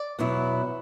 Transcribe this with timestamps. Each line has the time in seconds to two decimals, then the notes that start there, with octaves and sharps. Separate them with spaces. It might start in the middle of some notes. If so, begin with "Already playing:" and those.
Already playing: D5
0.19 E2 B2 F#3 B3 E4